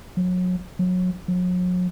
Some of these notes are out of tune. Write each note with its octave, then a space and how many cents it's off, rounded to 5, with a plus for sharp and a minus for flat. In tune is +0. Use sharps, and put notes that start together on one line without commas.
F#3 -30
F#3 -25
F#3 -40